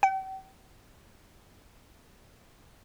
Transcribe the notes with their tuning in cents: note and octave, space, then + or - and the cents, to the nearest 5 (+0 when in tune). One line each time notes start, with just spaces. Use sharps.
G5 -40